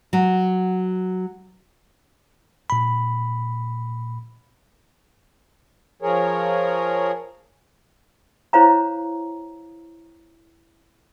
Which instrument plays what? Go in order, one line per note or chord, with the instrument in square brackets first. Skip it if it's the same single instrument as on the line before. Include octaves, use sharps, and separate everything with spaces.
[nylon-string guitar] F#3
[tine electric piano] A#2 B5
[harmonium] F3 G#4 A#4 C#5
[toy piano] E4 C5 C#5 F5 A#5